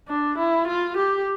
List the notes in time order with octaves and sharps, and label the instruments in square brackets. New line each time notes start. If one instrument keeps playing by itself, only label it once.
[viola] D4
E4
F4
G4